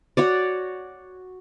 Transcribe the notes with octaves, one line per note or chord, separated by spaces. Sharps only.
F#4 C#5 D5